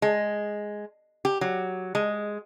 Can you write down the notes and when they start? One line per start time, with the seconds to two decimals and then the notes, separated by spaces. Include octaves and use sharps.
0.02 G#3
1.25 G4
1.41 F#3
1.95 G#3